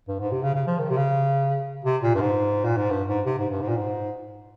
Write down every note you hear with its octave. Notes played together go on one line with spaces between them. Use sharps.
G2
G#2
C3
C#3
C#3
F3
D#3
C3
C#3
C3
A#2
G2
G#2
A#2
G#2
G2
G#2
C3
G#2
G2
G#2
A#2
G#2